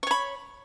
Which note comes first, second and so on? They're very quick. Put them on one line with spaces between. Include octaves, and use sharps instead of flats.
C#6 C#5 B5